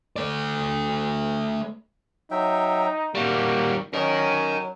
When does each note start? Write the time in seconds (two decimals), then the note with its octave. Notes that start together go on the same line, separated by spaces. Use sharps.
0.16 A3 D5
2.31 F#3 D#4 E5 G5
3.15 D#3 G3 A#3 F#4
3.94 F#3 C#4 A#4 D#5